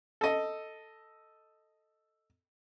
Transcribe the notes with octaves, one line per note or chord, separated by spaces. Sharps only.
A4 D#5